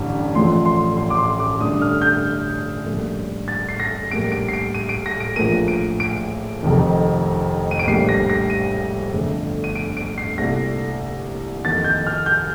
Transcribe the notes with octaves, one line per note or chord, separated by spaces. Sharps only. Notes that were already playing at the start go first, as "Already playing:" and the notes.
Already playing: A1 G2 D3
A1 A2 F3 A3 C6
C6
C6
D6
C6
D6
G2 D3 A3 D#6
F6
G6
A#1 A2 G3 A#3
A6
C7
A#6
A#1 A2 G3 A#3 D7
D7
C7
D7
D#7
D7
A#6
D7
A#1 A2 F3 A#3 D#7
D7
D7
F1 F2 D#3
D#7
D7
A#1 A2 G3 A#3 C7
A#6
A#6
D#7
G1 F2 D3 A3
D#7
D7
D7
C7
C2 A#2 A3 A#6
F2 D#3 A#3 A6
G6
F6
G6